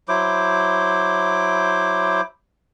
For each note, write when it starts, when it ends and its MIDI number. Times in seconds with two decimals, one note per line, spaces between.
0.08 2.21 54
0.08 2.21 64
0.08 2.21 72
0.08 2.21 86